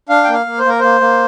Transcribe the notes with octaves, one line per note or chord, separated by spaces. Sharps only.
D4 F5
A#3 G5
F5
A#3
C5
A#3 A#4
A#3 C5
A#3